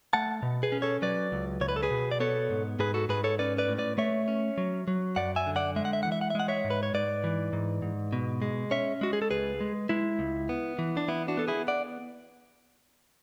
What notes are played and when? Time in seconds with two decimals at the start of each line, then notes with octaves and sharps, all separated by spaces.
0.13 A3 F#5 A5
0.43 B2
0.63 G#4 B4
0.72 C#4
0.82 A4 C#5
1.02 F#3 B4 D5
1.32 C#2
1.61 C#2 C#5
1.69 B4
1.76 A4
1.83 G#4 B4
1.91 B2
2.11 D5
2.20 B3 A4 C#5
2.50 G#2
2.79 G#2 G#4 B4
2.94 F#4 A4
3.09 G#2 G#4 B4
3.24 A4 C#5
3.39 C#4 B4 D5
3.58 B4 D5
3.68 A2
3.78 B4 D5
3.98 A3 C#5 E5
4.28 C#4
4.58 F#3
4.88 F#3
5.16 F#2 D5 F#5
5.36 E5 G#5
5.47 D3
5.56 D5 F#5
5.76 G#3 E5
5.85 F#5
5.93 E5
6.03 E3 F#5
6.12 E5
6.21 F#5
6.30 E5
6.35 G#3 F#5
6.48 C#5 E5
6.65 G#2
6.70 B4
6.83 C#5
6.94 G#2 B4 D5
7.24 E3
7.53 G#2
7.82 G#2
8.13 B2
8.42 G#3
8.71 C#4 C#5 E5
9.01 G#3 F#4
9.13 G#4
9.22 A4
9.30 C#2 G#4 B4
9.61 G#3
9.89 G#3 E4
10.19 C#2
10.49 B3
10.79 E3
10.97 D4
11.08 B3 E4
11.28 D4 F#4
11.37 B3 A4
11.48 E4 G#4
11.68 D5 F#5